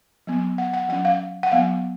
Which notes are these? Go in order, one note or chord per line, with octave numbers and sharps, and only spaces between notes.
F#3 B3
F#5
F#5
F#3 C#4 F#5
F5
F#5
F#3 B3 F5